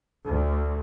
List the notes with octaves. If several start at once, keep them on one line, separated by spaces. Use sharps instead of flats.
D2